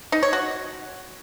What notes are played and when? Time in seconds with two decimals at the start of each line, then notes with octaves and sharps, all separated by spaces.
0.12 D#4
0.23 C#5
0.33 F#4